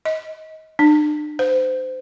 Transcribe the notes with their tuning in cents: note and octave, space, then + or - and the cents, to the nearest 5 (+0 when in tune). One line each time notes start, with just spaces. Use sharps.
D#5 +25
D4 +40
C5 -25